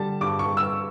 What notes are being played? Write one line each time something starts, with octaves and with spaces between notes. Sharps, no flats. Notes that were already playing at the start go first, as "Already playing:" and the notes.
Already playing: D3 G3 A5
G2 D6
C#6
G3
E6